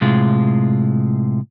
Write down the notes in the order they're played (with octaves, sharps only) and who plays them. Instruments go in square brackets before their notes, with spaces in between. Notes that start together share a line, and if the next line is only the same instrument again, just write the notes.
[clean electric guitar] A2 C3 G#3 F4